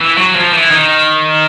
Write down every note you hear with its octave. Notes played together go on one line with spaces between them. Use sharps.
E3
F#3
F3
E3
D#3